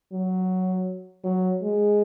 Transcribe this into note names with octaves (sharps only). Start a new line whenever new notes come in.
F#3
F#3
G#3